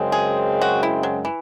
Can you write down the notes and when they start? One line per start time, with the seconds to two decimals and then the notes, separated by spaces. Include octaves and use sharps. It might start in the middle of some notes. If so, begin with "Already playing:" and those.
Already playing: F#2 C#3 G#3 C4
0.12 G#4
0.61 F#4
0.83 E4
1.03 F#3
1.25 E3